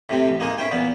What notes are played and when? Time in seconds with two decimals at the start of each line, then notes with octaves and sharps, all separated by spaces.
0.09 A2 C3 C4
0.29 A1
0.40 G#3 A#3 D#4 G#4
0.58 C#4 E4 C5 G5
0.71 E2 A#2 B3